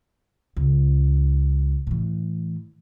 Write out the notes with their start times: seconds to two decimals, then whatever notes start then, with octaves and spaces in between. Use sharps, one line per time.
0.57 C#2
1.87 A2 E3